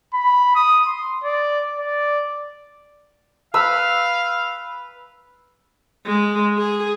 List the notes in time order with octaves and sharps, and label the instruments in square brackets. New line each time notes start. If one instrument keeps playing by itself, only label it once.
[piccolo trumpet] B5
D#6
C6
D5
D5
[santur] B4 B5 E6 [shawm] F5
[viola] G#3
G#4